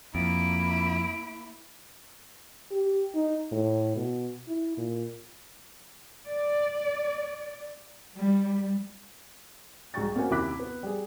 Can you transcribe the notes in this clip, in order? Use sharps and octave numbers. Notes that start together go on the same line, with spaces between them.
F2 A#3 E4 D7
G4
D#4
A2
B2
E4
A#2
D5
G3
C2 G#2 G#3 G5 C#6 A6
A#3 C4 C#4 F#4 G#5
D#2 C3 E4 D6 F#6 B6
B3
G3 G#4